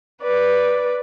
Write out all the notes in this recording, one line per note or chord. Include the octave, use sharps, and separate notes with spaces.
B4 D5